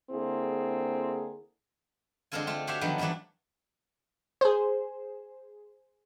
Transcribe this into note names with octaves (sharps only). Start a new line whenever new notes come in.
D3 A#3 C4 E4 G#4
D3 G#3 C4 F4 A4 G#5
A3 F4
F#4 G4 C5 C#5 E5 F5
D3 D#3 F3 F#3 A3 B3
E3 F#3 G3 A3 D4
G#4 C5